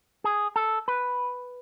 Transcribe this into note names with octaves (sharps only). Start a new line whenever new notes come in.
G#4
A4
B4